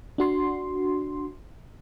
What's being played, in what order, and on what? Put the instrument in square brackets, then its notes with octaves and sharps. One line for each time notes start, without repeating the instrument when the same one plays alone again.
[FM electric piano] D4 F#4 C6